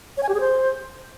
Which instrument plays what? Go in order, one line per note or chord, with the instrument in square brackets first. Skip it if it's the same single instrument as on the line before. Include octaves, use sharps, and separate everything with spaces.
[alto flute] C#5
G#5
G4
G#4
C5